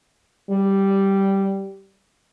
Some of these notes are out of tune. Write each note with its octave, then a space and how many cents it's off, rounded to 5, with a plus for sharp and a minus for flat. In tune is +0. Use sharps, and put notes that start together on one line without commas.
G3 -5